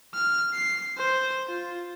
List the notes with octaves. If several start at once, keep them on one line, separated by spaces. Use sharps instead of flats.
F6
C7
C5
F4